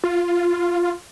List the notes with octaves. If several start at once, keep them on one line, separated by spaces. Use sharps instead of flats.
F4